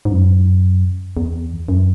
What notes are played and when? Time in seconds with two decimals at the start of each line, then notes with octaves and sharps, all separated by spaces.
0.05 G#2
0.11 F#2
1.17 E2
1.68 F#2